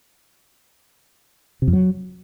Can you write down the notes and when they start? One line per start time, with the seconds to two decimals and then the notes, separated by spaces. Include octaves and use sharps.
1.62 C3
1.68 F2
1.73 F#3